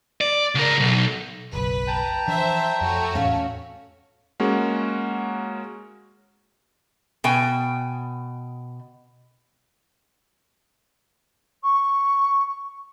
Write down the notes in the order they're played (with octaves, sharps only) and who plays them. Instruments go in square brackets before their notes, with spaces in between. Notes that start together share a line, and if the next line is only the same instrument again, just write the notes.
[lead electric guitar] D5
C#2 A#4
B1
[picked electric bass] F#1 B1 [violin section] B4
[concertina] G5 A5 A#5
[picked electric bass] E3 F3 D4 [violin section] C5 E5
[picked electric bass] F2 [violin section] A3 F#4 C#5
[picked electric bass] E2 A2 [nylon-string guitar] C#4 F5 A5
[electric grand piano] G#3 A#3 C#4 F#4
[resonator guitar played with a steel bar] B2 G5 G#5
[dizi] C#6